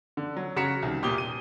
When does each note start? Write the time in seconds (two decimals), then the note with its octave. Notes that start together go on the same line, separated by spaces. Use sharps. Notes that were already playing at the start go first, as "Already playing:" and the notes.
0.17 D3
0.36 F#3
0.56 C#3 F#4 A#5 B6 C#7 E7
0.82 C2 D#3
1.02 E1 A#2 G4 D#6 G7
1.18 D#7